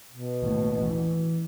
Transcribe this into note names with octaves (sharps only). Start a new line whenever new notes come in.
B2
D#2 A2
A1
E3